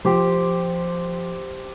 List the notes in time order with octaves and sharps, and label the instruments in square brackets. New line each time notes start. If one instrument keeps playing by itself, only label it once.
[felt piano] F3 [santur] G4 C5